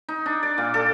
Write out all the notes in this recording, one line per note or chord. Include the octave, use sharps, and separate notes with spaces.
D#4
D4
D5
A#2
A4